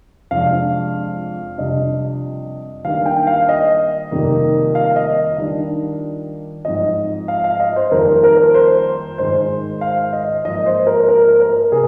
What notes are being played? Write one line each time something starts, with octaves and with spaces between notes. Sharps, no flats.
F2 C3 F3 G#3 D4 F5
F2 C3 G3 D4 D#5
D#3 G3 A#3 D4 F5
G5
F5
D#5
F2 C3 D#3 G3 A#3
F5
D#5
D#3 G3 D4 F4
G#2 F3 C4 F4 D#5
F5
F5
D#5
C5
F2 D#3 G3 A#3 A#4
A#4
C5
G#2 D#3 G#3 D#4 C5
F5
D#5
G#2 F3 A#3 D#4 D#5
C5
A#4
A#4
A#4
C3 A#3 G#4